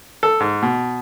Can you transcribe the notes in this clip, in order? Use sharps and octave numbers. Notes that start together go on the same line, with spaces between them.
A4
G#2
B2